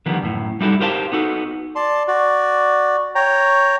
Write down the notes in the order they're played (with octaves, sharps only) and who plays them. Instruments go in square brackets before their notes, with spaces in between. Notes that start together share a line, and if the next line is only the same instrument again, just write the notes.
[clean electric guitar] D3 D#3 F3 G3 B3
F#2 A2
G3 D#4 E4 F#4 A4
G4 A#4 C5 F5 G5 A5
B3 D#4 F#4 A4
[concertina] D5 A5 C6
F#4 D5
C#5 G5 A#5